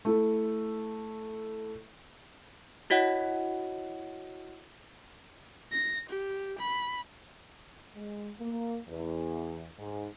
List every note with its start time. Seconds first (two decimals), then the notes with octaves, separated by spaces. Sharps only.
0.05 A3 E4 A4
2.90 E4 F#4 C#5 D#5 F#5
5.72 A#6
6.09 G4
6.58 B5
7.95 G#3
8.39 A#3
8.88 E2
9.78 G#2